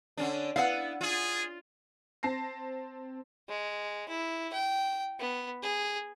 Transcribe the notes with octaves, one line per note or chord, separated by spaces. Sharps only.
D3 C#4 D4
B3 E4 F5 F#5
F4 G#4
C4 A5 A#6 C7
G#3
E4
G5
B3
G#4